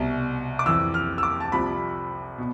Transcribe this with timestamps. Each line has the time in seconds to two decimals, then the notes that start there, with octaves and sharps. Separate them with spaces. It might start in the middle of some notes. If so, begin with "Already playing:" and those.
Already playing: C2 B2
0.59 D6
0.66 F2 E3 E6
0.94 F6
1.18 E6
1.23 D6
1.40 A5
1.52 C2 C3 F3 B5
2.38 B2